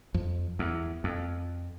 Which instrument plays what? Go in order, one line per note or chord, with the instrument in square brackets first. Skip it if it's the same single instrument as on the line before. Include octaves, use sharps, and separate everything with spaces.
[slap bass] F2
E2
F2